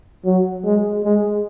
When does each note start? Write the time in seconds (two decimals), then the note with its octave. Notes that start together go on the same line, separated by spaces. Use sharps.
0.25 F#3
0.64 G#3
1.04 G#3